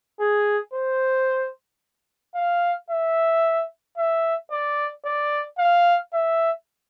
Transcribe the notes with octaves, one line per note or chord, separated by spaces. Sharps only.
G#4
C5
F5
E5
E5
D5
D5
F5
E5